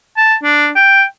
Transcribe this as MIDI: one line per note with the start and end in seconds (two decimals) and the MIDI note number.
0.17 0.35 81
0.44 0.69 62
0.75 1.03 79